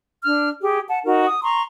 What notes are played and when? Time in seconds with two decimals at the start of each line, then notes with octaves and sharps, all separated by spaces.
0.25 D4 F6
0.61 G4 G#4
0.89 F#5 A5
1.05 D#4 F#4 A#4
1.25 D#6
1.42 A#5 C6 C#6